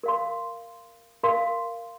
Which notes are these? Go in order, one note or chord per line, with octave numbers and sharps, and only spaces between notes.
A#4 F5 C6
A#4 F5 C6